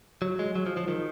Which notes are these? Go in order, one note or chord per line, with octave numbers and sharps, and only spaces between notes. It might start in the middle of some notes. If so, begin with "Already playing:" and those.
F#3
G#3
F#3
F3
F3
D#3